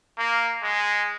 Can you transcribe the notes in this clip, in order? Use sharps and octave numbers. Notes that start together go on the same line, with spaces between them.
A#3
G#3